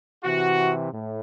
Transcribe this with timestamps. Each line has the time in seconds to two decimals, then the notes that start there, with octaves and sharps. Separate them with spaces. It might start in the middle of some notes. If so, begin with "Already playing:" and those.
0.23 C3 E3 F#4
0.92 A2